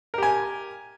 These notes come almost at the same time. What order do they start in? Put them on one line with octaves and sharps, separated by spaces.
A#4 G4 G#5